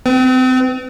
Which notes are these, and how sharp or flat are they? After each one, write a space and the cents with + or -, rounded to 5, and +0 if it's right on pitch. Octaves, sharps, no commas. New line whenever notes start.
C4 -30 B4 +40